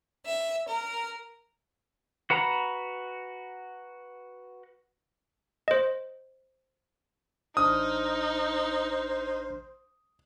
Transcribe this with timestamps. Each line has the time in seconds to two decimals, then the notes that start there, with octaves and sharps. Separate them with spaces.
0.25 E5
0.67 A#4
2.30 F#4 B4 F#5 A#5 B5
5.68 C5 D#5
7.57 A1 D4 D#4 C5 D#6 F6